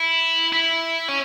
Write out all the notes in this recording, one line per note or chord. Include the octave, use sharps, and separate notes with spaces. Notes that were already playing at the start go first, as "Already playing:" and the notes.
Already playing: E4
E4
C#4